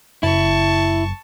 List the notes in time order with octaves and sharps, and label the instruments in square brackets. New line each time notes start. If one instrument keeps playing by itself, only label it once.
[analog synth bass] F#1 [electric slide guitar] E4 [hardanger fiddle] A5 C#6